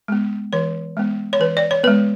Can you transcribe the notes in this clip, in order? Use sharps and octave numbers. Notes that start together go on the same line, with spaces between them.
G#3 B3
E3 C#5
G#3 B3
C#5
E3 B4
D5
C#5
G#3 B3 B4